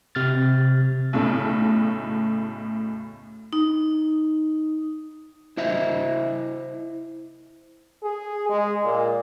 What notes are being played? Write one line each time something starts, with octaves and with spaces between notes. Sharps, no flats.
C3 F6 A6
B1 A2 C#3 A3
D#4
E4 C5 D#5 E5
G#4
G#3
A#2